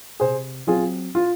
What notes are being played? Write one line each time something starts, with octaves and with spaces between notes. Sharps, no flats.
C3 G#4 C5
F#3 C4 F4 G#4
F4